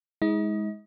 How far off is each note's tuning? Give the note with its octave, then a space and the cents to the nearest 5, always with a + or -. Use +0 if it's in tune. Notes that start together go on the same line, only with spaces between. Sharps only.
G#3 +0 D#4 +45